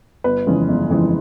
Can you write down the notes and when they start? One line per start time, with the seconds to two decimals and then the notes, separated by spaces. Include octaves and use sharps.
0.24 G1 B4
0.47 F2 C#3 E3 G#3
0.69 G1
0.90 F2 C#3 E3 G#3